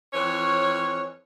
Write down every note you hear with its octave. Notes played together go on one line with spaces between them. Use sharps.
F2 E3 C#5